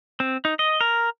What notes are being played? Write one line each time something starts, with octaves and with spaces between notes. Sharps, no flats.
C4
D#4
D#5
A#4